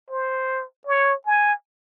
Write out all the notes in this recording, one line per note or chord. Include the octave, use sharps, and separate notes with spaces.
C5
C#5
G#5